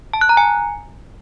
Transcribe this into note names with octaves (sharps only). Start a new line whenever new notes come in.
A5
F#6
A#5
G#5